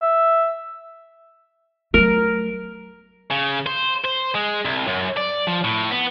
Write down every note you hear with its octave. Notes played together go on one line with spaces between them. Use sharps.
E5
F#3 A3 A#4
C#3
C5
C5
G#3
C2
F#2
D5
F3
A2
B3